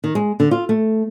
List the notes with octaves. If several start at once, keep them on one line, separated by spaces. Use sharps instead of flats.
D#3
G#3
D3
F4
A3